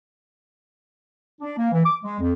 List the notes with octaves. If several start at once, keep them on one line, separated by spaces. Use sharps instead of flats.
D4
A#3
E3
D6
G#3
F2